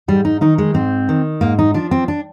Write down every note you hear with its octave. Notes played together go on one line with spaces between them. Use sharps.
G#2 G3
D#4
D#3 D#4
G#3
G#2 C4
D#3
G#2 A#3
D#4
F3 D4
C4
D4